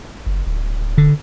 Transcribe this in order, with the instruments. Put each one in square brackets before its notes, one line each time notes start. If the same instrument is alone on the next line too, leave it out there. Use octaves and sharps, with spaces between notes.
[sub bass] F#1
D1
[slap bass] D3